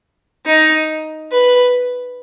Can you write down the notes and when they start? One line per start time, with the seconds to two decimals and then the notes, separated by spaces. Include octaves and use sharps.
0.46 D#4
1.32 B4